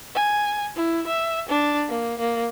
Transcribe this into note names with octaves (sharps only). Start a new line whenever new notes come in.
G#5
E4
E5
D4
A#3
A#3